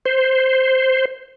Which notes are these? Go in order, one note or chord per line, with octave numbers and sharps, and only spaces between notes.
C5